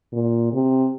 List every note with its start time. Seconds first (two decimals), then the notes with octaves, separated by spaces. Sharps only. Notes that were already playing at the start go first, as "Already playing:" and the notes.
0.13 A#2
0.52 C3